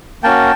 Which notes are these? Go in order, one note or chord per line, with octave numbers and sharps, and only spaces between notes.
A#3 C#4 F#4 G5 A5